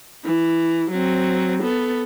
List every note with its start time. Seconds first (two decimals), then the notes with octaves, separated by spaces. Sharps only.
0.25 E3
0.91 F#3 C4
1.63 B3 A4